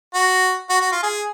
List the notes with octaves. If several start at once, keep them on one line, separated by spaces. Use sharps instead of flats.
F#4
F#4
F#4
F4
G#4